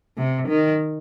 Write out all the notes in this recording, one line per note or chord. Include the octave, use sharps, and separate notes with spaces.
C3
D#3